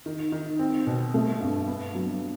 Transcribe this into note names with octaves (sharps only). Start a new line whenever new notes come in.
D#3
D#3
C4
B2
A3
G2
B3
F#3